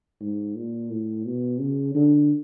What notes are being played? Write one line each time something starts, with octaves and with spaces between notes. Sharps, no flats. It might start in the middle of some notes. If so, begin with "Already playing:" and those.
G#2
A#2
A2
B2
C#3
D3